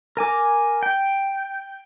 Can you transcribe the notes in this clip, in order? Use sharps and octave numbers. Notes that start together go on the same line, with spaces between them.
A#4 G#5 D6
G5